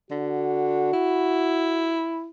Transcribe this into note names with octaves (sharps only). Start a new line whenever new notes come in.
D3 F#4
E4